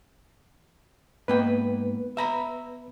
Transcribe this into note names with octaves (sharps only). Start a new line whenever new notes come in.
G#2 A#3 B3 B4 G5
E5 A#5 B5